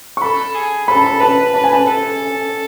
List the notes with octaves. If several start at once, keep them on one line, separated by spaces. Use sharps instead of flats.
C#6
A4 B5
G#4
A4 B5
A5
B5
B4 A5
B4 A5
G#5
A5
A4